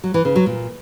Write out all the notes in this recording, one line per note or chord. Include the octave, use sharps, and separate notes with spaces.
F#3
E3
C#3
F#3
A#2